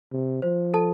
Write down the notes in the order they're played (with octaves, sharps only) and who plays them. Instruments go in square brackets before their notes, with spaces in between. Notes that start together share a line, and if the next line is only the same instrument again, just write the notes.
[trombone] C3
[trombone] F3 [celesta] C5
[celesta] A4 A5